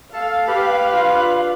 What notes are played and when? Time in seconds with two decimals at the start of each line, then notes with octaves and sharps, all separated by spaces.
0.14 A4 F5
0.48 G4 B4
0.92 D4 F4